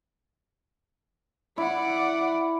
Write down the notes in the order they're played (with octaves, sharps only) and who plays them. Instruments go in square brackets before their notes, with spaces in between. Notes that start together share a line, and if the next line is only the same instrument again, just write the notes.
[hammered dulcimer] E4 [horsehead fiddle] D5 F#5